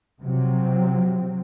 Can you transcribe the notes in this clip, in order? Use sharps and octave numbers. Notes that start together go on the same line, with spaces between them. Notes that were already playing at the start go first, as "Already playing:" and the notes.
C3 F3 F#3 C4